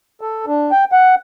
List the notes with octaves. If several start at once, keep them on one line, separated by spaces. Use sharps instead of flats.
A4
D4
G5
F#5